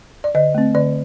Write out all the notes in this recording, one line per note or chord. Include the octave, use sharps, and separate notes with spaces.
D5
D3 D#5
A3 C4
D3 D5